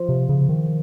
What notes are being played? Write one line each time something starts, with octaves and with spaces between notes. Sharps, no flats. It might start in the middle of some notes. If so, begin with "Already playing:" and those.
Already playing: F3
C3
C#3
D#3